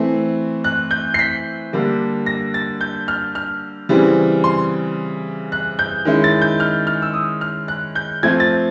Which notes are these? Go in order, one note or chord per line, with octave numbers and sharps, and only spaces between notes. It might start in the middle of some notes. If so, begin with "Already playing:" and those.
Already playing: E3 A3 C4
F#6
G6
C7
B6
D3 G3 A#3 D4
A#6
A6
G6
F6
F6
C#3 E3 G3 C4
C6
F#6
G6
D#3 G#3 C#4 E4
A6
G6
F6
F6
E6
D#6
F6
F#6
G6
F3 A3 C4 G#6
A6